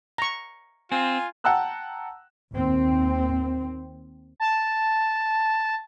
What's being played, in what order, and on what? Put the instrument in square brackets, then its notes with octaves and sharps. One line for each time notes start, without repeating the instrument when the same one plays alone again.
[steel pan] A#5 C#6
[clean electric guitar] C4 [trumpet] F4 [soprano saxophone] G#5
[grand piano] F#5 G5 A5 A#5 E6 F#6
[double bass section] D#2 C4
[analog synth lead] A5